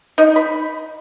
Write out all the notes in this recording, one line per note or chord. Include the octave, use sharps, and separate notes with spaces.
D#4
B5